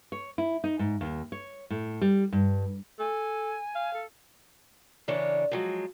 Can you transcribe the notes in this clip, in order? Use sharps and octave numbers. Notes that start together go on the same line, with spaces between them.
C#5
E4
D#4
G#2
D#2
C#5
A2
G3
G2
A4 G#5
F5
A4
C#3 E3 D4 A#4 C#5
F3 F#3 G#3